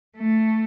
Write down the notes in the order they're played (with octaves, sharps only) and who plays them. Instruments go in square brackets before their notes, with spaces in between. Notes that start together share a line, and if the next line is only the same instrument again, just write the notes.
[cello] A3